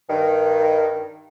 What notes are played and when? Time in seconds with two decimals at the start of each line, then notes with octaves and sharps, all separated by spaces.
0.08 G2 D#3